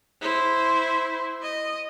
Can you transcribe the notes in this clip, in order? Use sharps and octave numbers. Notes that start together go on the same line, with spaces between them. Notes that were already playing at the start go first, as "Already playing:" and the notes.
E4 C5
D#5